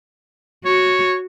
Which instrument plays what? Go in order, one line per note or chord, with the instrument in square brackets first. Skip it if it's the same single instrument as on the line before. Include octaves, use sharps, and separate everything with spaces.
[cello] F#4 [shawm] C#5